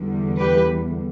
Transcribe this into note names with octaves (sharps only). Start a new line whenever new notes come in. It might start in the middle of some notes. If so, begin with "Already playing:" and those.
Already playing: E2 D3 G3
G4 B4